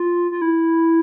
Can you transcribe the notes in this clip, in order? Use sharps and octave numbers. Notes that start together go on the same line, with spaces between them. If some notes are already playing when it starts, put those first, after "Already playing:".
Already playing: F4
F4
E4